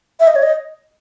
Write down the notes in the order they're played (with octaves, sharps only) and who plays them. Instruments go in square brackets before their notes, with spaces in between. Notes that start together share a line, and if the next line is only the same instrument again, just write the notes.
[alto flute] E5
D#5
C#5
D#5